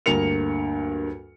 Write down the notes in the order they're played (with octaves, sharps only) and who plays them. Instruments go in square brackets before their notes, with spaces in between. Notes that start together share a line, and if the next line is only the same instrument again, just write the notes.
[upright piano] D2 G2 A#3 A#4 C#7 F7